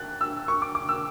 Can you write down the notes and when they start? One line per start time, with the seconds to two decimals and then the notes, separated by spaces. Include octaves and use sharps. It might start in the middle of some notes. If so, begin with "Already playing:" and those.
Already playing: F#6 A6
0.21 E6
0.48 C#6
0.62 D6
0.75 D6
0.89 E6